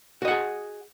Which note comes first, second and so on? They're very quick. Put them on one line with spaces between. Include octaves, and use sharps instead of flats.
F#4 D#5 F#5 G#4